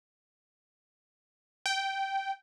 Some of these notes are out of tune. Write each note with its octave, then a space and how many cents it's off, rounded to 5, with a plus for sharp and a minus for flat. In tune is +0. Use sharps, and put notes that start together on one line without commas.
G5 -10